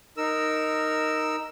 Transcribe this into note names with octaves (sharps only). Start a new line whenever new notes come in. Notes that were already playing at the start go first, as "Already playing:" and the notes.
D#4 A#4 E6